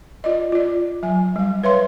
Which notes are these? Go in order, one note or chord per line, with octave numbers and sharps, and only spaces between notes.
F4 D5 D#5
F4 D5
F#3 G#5
G3 F5
B4 C#5 E5 F5 C6